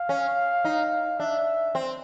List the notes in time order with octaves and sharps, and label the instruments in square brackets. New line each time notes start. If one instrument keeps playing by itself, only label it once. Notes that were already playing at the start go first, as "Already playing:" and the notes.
Already playing: [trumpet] F5
[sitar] C#4
D#4
[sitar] D4 [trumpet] E5
[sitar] C4